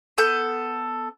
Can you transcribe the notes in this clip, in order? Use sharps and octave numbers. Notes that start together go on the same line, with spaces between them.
B3 A4 G6